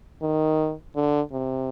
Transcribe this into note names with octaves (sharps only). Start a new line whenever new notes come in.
D#3
D3
C3